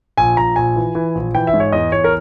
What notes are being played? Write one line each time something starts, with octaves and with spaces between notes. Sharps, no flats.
A#1 G#5
A#1 A#5
A#1 G#5
E3
E3
A#1
E3 G5
E5
G#2
C#5
E2 D#5
E2 C#5
A#4